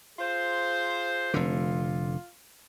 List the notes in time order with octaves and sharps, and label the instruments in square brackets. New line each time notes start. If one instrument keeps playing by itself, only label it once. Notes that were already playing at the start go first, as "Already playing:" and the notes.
[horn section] F4 G#4 C5
[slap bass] F1 D3 [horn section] F4